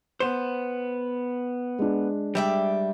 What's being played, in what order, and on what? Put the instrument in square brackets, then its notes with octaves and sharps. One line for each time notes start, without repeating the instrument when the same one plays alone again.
[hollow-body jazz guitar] B3 C5 [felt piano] E7
[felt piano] G#3 D4
[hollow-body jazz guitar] G3 [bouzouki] D5 E5 G5